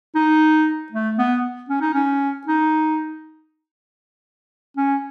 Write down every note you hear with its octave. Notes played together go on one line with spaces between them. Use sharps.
D#4
A3
B3
C#4
D#4
C#4
D#4
C#4